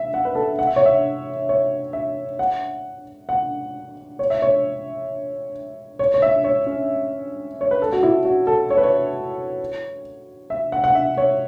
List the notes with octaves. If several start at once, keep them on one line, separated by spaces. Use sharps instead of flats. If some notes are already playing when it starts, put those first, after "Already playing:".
Already playing: E5
F#5
B4
A4
F#5
E5
C#5
E5
C#5
E5
F#5
F#5
C#5
E5
C#5
C#5
C#5
E5
C#5
C#4
C#5
B4
A4
F#4
E4
F#4
A4
C#5
B4
C#5
E5
F#5
F#5
E5
C#5